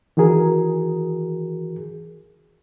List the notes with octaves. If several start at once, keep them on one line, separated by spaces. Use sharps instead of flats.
D#3 E3 F#4 G#4 A#4